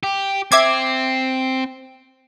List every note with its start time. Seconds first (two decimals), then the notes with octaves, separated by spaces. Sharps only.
0.03 G4
0.52 C4 E5 D6 G#6